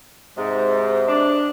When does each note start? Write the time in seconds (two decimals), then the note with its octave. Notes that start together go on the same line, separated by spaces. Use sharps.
0.37 G#2 C3
1.08 D4